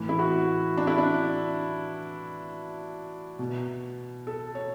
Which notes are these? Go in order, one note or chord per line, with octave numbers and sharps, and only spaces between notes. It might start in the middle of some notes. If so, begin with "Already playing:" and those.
Already playing: A2 E3
E4
F#4
D4
E4
D4
B2
A4
C#5